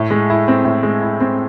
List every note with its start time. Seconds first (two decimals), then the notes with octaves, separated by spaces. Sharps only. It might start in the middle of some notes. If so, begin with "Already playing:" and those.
Already playing: A2
0.11 G#3
0.30 E4
0.48 C4
0.65 A2
0.83 G#3
1.02 E4
1.20 C4